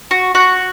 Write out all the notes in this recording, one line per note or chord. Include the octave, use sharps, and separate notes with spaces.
F#4
F#4